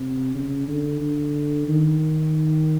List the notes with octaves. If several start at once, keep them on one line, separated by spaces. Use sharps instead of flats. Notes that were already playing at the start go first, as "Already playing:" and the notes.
Already playing: C3
C#3
D3
D3
D#3